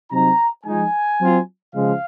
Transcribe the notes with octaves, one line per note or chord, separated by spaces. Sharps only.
C3 F#3 C4 D#4 A#5
F3 G#3 D#4 G#5
F#3 C4 F4
C#3 F3 G#3 F5